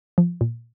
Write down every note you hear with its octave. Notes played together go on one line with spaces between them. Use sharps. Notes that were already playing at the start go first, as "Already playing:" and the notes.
F3
A#2